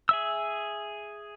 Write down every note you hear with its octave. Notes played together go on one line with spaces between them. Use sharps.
G#4 E5 E6